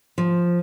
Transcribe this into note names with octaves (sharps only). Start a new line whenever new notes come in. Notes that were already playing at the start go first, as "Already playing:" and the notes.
F3